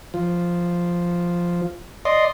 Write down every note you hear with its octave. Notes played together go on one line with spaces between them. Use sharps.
F3
D5 D#5 C6